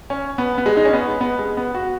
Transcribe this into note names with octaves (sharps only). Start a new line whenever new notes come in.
C#4
B3
B3
G#3
D#4
C#4
B3
B3
G#3
B3
F#4